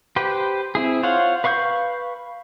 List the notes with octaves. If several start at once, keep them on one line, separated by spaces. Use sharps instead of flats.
G4 B4 C5 G5
C4 E4 G#4
F4 C5 C#5 F5 F#5
B4 F5 C#6 E6 G6